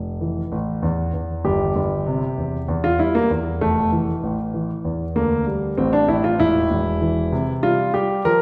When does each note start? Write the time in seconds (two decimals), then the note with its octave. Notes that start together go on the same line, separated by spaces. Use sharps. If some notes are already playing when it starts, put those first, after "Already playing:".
Already playing: F1
0.21 E3
0.52 A1
0.83 E2
1.14 E2
1.45 G1 G4
1.76 G1
2.06 C3
2.38 E2
2.68 E2
2.84 F4
2.99 G3 E4
3.15 A#3
3.31 E2
3.61 F1 A3
3.92 E3
4.23 A1
4.54 E3
4.85 E2
5.16 D2 A#3
5.47 G3
5.77 A1 C4
5.93 D4
6.08 A1 E4
6.24 F4
6.39 E1 E4
6.70 E1
7.01 E3
7.32 C3
7.63 G3 F4
7.94 G3 G4
8.25 F3 A#4